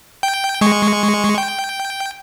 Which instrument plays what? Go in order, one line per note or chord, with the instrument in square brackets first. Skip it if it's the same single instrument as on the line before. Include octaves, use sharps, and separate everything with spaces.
[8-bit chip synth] G5
G#3 C#6
G5